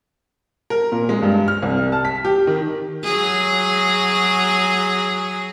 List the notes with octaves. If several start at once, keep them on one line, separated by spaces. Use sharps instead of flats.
A#4
A#2
G#3
G2
F6
C2
A5
B6
G4
D#3
F#3 G#4